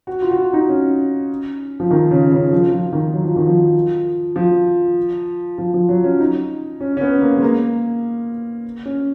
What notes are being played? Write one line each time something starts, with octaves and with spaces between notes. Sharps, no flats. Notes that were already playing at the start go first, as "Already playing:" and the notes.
F#4
F4
F#4
F4
D#4
C#4
F3
D#3
C#3
C#3
F3
F3
D#3
F#3
F3
D#3
F3
F3
F3
F3
F#3
C#4
D#4
C#4
C#4
B3
A#3
G#3
A#3
C#4